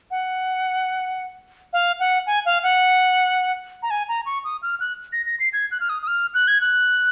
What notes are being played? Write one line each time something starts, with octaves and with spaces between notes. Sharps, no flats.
F#5
F5
F#5
G#5
F5
F#5
A#5
G#5
A#5
C#6
D#6
F6
F#6
A#6
A#6
C7
G#6
F#6
F6
D#6
D#6
F6
F#6
G#6
F#6